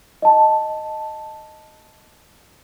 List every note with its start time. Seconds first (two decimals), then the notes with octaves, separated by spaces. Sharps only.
0.22 D#5 A5